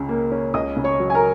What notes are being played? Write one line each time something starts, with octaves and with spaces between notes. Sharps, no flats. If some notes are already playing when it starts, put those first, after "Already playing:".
Already playing: C#2 C#3
A#3
C#4
C#2 D#5 D#6
C#3
C#5 C#6
F#3
G#5
A#4 A#5